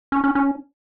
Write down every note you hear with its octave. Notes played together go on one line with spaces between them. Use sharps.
C#4
C#4
C#4